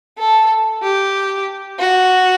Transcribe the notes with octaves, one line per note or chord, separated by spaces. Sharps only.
A4
G4
F#4